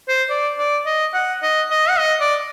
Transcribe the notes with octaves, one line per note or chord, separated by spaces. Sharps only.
C5
D5
D5
D#5
F#5
D#5
D#5
F#5
D#5
D5